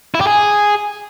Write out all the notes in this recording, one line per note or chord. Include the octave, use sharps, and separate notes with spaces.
E4
G4
G#4